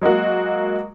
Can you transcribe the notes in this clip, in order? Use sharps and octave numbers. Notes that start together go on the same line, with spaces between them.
F#3 G#3 A#3 F#4